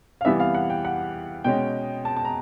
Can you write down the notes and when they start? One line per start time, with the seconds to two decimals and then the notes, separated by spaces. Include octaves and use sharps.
0.21 F5
0.24 C3 E3 G3 B3 E5
0.40 F5
0.54 F#5
0.70 G5
0.85 F#5
1.44 B2 G#3 C#4 G5
2.05 A5
2.16 A5
2.25 A#5